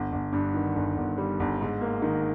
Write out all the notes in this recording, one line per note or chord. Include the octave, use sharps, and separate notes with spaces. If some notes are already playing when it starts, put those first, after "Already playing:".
Already playing: G1
G1
G2
D#3
G1
G1
G3
G1
G#2
A#3
D#3